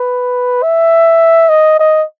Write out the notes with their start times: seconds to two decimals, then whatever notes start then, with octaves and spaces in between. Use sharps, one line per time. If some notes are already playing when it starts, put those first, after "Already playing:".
Already playing: B4
0.63 E5
1.49 D#5
1.79 D#5